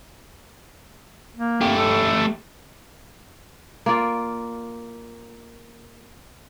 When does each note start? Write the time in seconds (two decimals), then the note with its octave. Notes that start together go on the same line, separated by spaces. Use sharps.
1.36 A#3
1.61 A3 G4
1.77 A4
3.86 A#3 F4 D5